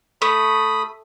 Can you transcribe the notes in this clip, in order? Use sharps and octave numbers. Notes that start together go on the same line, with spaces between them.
A3 B5 D#6